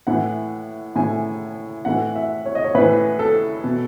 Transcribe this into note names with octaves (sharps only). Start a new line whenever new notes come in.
A2 E3 F#5
A2 E3 G#5
A2 E3 F#5
E5
C#5
D#5
C#5
A2 E3 B4
A4
B2